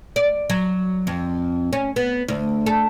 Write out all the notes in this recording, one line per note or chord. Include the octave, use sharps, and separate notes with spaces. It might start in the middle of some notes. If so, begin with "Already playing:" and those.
D5
F#3
F2
C#4
B3
D2
A4